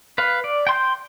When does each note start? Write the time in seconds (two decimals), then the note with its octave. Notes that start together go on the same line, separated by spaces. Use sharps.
0.18 B4 F5
0.44 D5
0.67 G5 C6 G6